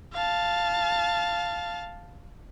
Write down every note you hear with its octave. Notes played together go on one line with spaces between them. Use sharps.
F5 A5